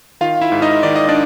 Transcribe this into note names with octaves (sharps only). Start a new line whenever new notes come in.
D#3 F4 F5
E4 E5
G#2
D#4 D#5
D#3 D5
D#5
D4 D5